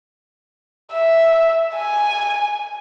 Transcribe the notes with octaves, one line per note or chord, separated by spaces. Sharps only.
E5
G#5